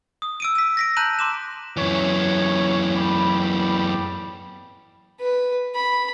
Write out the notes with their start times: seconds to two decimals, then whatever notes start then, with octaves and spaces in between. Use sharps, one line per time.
0.22 D#6
0.40 E6 D7 D#7
0.55 E6 B6
0.77 A#6 B6 D7
0.97 A5 A#5 F#6 G6 D#7 F#7
1.19 C6 D6 E7
1.77 F#2 E3 C#5
2.96 D5 G5 B5
5.20 B4
5.75 B5